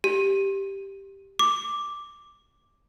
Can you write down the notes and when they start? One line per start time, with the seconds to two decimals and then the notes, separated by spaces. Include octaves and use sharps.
0.04 G4
1.39 D6